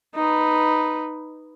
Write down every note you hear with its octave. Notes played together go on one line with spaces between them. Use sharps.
D#4 B4